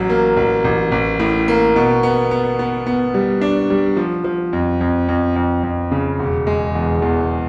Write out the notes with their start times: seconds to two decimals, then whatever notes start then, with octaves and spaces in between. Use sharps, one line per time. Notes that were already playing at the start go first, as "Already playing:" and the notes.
Already playing: A1 F#3
0.10 A#3
0.37 A1
0.65 A1
0.92 A1
1.20 A2
1.48 A#3
1.76 B2
2.03 B3
2.31 B3
2.59 B3
2.87 B3
3.14 G3
3.41 D4
3.70 G3
3.97 F3
4.24 F3
4.53 F2
4.81 F2
5.09 F2
5.36 F2
5.63 F2
5.91 C#3
6.20 E1
6.47 G#3
6.75 E2
7.02 E2